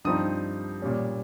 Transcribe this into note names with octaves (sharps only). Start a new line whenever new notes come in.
G2 F3 C4 D#4 D#6
A#2 G3 C#4